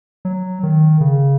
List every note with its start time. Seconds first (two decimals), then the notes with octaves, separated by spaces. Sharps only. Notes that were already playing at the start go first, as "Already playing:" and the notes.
0.25 F#3
0.63 D#3
1.00 C#3